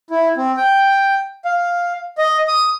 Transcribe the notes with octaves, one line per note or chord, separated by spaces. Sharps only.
E4
C4
G5
F5
D#5
D#6